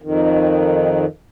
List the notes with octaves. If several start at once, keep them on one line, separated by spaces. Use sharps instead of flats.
F2 D#3